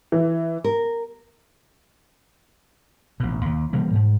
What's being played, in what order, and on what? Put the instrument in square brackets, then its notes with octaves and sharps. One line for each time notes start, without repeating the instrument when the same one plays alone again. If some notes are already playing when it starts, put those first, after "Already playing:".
[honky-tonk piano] E3
[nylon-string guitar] A#4
[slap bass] A1 B2
D#2
B2 E3 G3 A#3
G#2